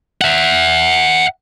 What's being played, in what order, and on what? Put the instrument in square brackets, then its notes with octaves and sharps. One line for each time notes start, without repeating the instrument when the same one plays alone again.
[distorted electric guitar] E5 F#5